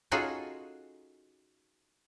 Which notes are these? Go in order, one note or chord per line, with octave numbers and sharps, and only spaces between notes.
C#4 D#4 F4 F#4 G#4 A4